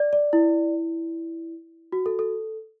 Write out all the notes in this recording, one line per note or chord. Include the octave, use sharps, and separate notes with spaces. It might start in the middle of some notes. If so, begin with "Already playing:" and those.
Already playing: D5
D5
E4
F#4
A4
A4